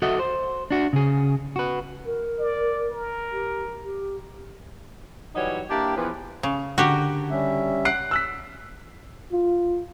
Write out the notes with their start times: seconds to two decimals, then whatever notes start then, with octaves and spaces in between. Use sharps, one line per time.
0.02 F#4 A4 D#5 E5 F#5
0.19 C5
0.71 D4 F#4
0.93 C#3 G#4
1.56 F#4 B4
2.06 A#4
2.39 D5
2.91 A#4
3.31 G4
3.83 G4
5.35 E3 F#3 G3 D#4 F#4 C#5
5.69 A#3 D4 E4 G4
5.96 E2 F3 B4
6.43 C#3
6.78 D3 F#4 G4 A#4
7.31 G3 C#4 E5
7.85 F#5 F#6 C7 D7
8.11 E6 F#6 B6
9.32 F4